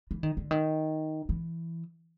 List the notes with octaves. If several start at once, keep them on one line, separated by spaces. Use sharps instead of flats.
E3
D#3
D3
D#3
E3